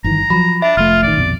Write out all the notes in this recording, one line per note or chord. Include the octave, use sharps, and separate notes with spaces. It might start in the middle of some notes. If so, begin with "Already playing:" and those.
G1 D#3 E3 A#5
F3 F#3 B5
D4 E5
F1 A3 F4 F6
A1 D#3 D5
A#1 F2 B2